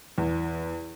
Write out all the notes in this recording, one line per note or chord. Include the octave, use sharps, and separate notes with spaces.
E2